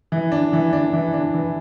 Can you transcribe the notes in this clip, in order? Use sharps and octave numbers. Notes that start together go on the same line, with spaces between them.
E3
D4
E3
D4
E3
D4
E3